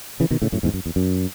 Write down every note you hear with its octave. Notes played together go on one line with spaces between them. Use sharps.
C#3 E3
B2 D#3
A2 C#3
F#2 A2
E2 G#2
F#2
E2
F#2